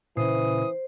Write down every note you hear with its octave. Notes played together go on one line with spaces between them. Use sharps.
A#2 C#3 E3 C5 D#6